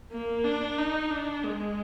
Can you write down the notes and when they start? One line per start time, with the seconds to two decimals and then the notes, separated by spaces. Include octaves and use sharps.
0.12 A#3
0.44 D4
0.78 D#4
1.11 D4
1.44 G#3